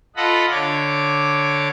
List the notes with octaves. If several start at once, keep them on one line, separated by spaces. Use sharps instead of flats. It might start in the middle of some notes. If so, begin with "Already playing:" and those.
F4 A4 D#5 F#5 B5
D3 C#5 D6